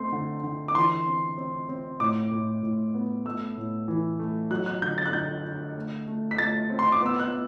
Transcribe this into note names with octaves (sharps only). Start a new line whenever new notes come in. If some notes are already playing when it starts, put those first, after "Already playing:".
Already playing: A3 C4 C6
D3
D3
D6
E3 C6
C4
C4
C4
A2 D6
A2
A2
B3
A3 E6
A2
E3
A3
F#3 F#6
F#6
D3 G6
A6
F#6
D3 G6
D3
A3
A3
B6
A3 A6
C4
C6
D6
B3 E6
F#6
B3